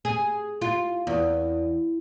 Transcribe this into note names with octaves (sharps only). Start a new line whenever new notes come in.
G#4
F4
E2